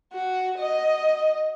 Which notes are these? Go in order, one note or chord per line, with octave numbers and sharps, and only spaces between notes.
F#4
D#5